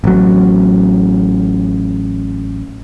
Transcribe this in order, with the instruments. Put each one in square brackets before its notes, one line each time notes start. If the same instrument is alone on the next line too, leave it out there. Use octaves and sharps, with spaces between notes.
[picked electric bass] A1 F#3